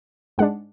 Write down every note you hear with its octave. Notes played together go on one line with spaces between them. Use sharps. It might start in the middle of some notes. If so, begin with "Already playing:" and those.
G#2 G#3 D4 F#5